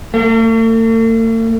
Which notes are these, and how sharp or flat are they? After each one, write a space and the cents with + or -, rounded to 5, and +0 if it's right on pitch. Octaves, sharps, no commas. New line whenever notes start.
A3 +45